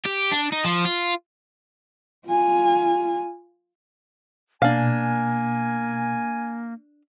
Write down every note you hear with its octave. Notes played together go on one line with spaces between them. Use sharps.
G4
D4
D#4
F3
F4
F4 G#5
B2 A#3 D4 F5 G#5